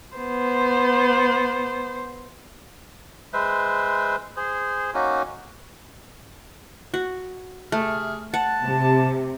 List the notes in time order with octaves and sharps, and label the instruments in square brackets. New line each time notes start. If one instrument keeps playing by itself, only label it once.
[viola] B3 C5
[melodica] G#3 B4 C5 E5
G#4 C5
A#3 C#4 D#4 F#4
[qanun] F#4
[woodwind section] C3 G#4 F6 [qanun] A3
[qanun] F#5 [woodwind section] A5
[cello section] C3